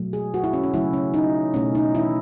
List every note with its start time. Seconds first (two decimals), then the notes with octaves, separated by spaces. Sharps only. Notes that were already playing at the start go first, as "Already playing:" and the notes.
Already playing: B2 F#3 A3
0.13 G#4
0.34 F#4
0.44 E4
0.53 C#4
0.64 C#4
0.74 C#3 F#3 A3 E4
0.93 C#4
1.14 D#4
1.54 B2 A3 C#4
1.75 D#4
1.95 E4